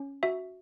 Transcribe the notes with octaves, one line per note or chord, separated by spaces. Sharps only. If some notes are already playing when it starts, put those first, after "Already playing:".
Already playing: C#4
F#4 E5